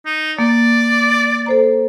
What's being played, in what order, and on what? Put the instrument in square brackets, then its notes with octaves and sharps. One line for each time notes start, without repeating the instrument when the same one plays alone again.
[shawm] D#4
[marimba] A#3 [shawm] D5
[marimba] A4 C5 A#5